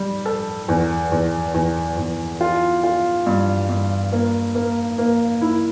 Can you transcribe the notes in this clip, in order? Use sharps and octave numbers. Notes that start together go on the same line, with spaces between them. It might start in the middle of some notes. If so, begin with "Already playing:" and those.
Already playing: G3
A4
E2
E2
E2
E2
F4
F4
G2
G2
A#3
A#3
A#3
E4